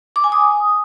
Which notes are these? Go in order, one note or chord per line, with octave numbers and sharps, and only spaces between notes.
D6
G#5
D#6